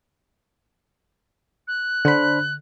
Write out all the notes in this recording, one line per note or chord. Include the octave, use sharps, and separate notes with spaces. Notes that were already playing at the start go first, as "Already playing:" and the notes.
F#6
D3 D4 C5 B5